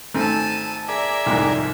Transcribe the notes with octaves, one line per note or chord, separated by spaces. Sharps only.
G#1 A3 C4 G#5 A5
G#4 A#4 D5 E5
C2 F2 G#2